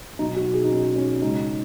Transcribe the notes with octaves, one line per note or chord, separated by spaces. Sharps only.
B2 F#3 D#4
F#4
G#4
D#4
C#4
C#4
C#3 G#3 D#4